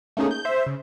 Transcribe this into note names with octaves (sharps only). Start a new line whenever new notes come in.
A3 A#3 C#4 D#4 G#4
G6
C5 E5
C#3